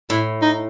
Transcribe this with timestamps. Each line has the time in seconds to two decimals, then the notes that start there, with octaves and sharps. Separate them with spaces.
0.10 A2 E4
0.42 D#4